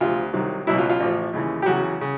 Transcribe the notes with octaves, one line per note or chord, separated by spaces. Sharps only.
D2 C3 F3 F4
C2 C3 D#3 F#3
C#2 B2 F#3 E4
F4
F4
A1 A2 F3
D#2 C#3 E3
G4
E2 C#3 F#3 F#4
C#3